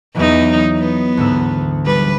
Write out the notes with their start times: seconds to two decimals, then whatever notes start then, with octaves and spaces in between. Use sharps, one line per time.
0.16 E2 E3 F#3 D#4
0.78 B3
1.17 D2 G#2 E6
1.86 G3 B4